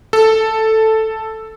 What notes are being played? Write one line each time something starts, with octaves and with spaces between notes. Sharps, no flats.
A4